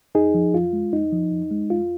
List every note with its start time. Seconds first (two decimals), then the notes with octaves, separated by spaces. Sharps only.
0.15 F2 D#4 G#4
0.34 F3
0.53 F2 F4
0.73 G#3
0.93 F2 D#4
1.12 F3
1.32 F2
1.51 G#3
1.70 F2 F4